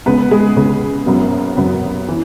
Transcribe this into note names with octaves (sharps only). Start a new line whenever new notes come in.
C#2 C#3 G#3 B3 B4
G#3 G#4
C#2 C#3 G#3 B3
F#1 F#2 F#3 B3
F#1 F#2 F#3 B3
E3